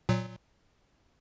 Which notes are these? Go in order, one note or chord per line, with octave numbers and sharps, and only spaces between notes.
A#2 F#3